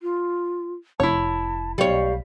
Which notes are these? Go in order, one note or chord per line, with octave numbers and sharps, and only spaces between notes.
F4
F1 E4 C#5 A5
B1 G3 C#5 F5